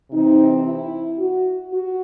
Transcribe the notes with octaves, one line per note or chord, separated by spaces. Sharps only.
C3 E3 C4 D#4
E4
F#4
F#4